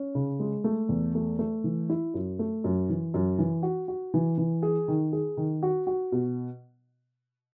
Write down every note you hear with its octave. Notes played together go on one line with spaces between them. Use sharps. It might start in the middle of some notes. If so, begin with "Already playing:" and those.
Already playing: C#4
C#3
G#3
A3
E2
A3
A3
E3
E4
F#2
A3
F#2
E3
F#2
E3
F#4
F#4
E3
E3
G#4
D#3
G#4
D#3
F#4
F#4
B2